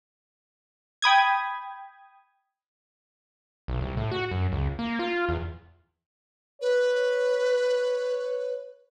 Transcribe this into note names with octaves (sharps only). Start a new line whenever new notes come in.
G5 B5 D#6 G#6
B1
C2
A2
F#4
F#2
C#2
A#3
F4
E2
B4 C#5